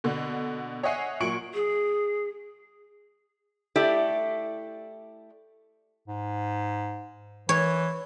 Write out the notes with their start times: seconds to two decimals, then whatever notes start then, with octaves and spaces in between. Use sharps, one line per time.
0.04 B2 D3
0.83 C#5 D#5 E5 F#5 G#5 C7
1.20 A#2 F#3 C#6 C#7 D7 F#7
1.54 G#4
3.76 A3 E4 G4 D5
6.08 G#2
7.49 E3 C#5